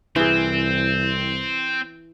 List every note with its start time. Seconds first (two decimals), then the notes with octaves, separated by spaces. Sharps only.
0.16 C2 E3 C4 G#4